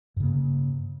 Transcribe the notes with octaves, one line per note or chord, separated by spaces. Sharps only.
G2 C#3 A#3